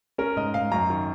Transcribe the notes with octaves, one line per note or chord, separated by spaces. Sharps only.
C#4 A#4
G#2 D#5
G#2 F5
F#2 A#5
D#3